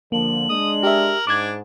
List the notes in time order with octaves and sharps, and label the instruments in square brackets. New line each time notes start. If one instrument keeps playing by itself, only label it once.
[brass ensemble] D3 F3 [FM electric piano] A#3 [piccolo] F#7
[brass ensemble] G#3 D4 [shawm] D#6
[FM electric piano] G4 E5 [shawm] A#4
[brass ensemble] G#2 [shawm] D4 [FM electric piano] D6 G#6